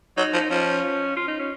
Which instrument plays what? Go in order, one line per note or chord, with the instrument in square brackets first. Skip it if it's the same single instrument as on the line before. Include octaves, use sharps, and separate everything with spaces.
[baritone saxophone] F#3 [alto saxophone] D#4
[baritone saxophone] F3
[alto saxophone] D#4
[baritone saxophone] F3 [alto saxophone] C#4
[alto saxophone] F4
D#4
C#4